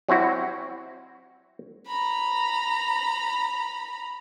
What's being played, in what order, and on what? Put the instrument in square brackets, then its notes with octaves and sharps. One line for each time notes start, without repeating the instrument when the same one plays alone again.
[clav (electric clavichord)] F#3 C4 E4 F#4
[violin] A#5 B5